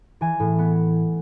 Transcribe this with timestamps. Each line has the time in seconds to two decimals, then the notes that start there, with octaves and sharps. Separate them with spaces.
0.21 E3 G#5
0.40 A2
0.58 B3